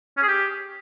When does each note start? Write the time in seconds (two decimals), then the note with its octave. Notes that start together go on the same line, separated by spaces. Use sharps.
0.17 C#4
0.22 G#4
0.28 G4